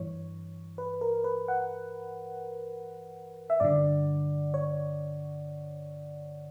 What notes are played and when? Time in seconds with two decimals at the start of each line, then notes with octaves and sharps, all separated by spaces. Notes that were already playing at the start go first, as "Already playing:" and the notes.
Already playing: G2 E3 C#5
0.78 B4
1.01 A#4
1.24 B4
1.48 F#5
3.50 E5
3.60 G2 D3 D5
4.54 C#5